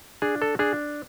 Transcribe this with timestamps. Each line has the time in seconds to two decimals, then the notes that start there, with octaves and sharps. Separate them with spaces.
0.22 D4 G#4
0.42 A4
0.59 D4 G#4